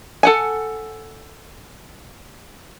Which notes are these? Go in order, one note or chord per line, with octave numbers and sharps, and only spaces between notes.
A4 F#5 G#5